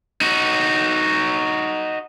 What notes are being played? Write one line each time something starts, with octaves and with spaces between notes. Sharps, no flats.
D#4 F#4